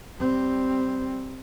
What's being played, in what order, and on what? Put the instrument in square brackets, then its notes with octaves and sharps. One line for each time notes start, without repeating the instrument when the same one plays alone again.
[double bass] G3 C4